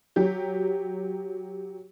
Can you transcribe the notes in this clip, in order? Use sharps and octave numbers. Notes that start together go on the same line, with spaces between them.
F#3 G4